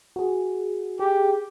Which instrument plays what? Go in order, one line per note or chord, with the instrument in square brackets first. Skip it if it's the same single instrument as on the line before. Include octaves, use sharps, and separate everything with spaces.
[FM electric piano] F#4 G#4
[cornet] G4 [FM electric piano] G#4